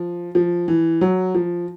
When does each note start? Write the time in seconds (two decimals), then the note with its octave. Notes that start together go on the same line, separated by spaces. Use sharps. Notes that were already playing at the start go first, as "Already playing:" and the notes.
Already playing: F3
0.35 F3
0.68 E3
1.01 F#3
1.35 F3